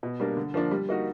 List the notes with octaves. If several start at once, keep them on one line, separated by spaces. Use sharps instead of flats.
B2
G3 A#3 D4
D3
F3 A#3 D4
G3
A#3 D#4 F#4